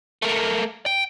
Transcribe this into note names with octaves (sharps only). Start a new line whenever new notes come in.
A3 A#3
G5